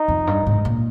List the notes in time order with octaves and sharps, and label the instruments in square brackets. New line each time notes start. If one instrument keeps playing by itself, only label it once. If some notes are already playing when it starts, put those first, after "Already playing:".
Already playing: [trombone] D#4
[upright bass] F2
G2
G#2
A#2